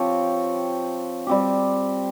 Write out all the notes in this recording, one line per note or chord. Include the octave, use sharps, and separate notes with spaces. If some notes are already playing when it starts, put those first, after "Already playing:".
Already playing: F3 C4 G4 C#5
G3 C4 G4